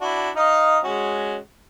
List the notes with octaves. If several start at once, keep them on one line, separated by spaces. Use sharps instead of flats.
D4 E4 F#4
D#4 D#5 F5
G#3 C#4 F#4